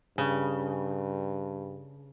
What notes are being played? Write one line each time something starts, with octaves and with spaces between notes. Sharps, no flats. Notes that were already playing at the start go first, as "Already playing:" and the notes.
G2 C#3